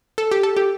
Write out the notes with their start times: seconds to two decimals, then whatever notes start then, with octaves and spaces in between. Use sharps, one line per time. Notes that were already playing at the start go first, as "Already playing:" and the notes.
0.18 A4
0.31 G4
0.43 A4
0.57 G4